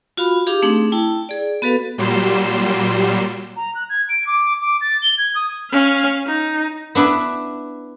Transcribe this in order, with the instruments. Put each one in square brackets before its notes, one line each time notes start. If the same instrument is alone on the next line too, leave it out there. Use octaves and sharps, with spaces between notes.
[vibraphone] F4 F#4 F5 B5
D#4 G4 G#4 F5 D6
A3 C4 D4 D#4 G#4
E4 G5 A5
G#4 D5
B3 F#4 A4 B4 F5
[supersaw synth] A#2 F#3 G3 C6 E7
[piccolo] A#5
F#6
G#6
D7
D6
D6
A6
G7
G#6
D#6
[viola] C#4 F5
D#4
[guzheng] B3 D4 E4 B4